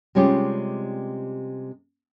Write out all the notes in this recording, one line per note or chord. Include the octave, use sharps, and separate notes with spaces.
C3 G3 G#3 C#4 F4 G4